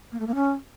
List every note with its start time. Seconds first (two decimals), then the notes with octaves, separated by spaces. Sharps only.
0.12 A#3
0.20 A3
0.27 A#3
0.35 C#4